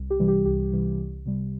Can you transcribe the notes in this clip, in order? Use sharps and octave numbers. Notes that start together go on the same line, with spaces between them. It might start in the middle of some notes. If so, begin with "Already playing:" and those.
Already playing: C2
G4
C3 E3 G3
G4
C2 G4
C3 E3 G3
C2
C3 G3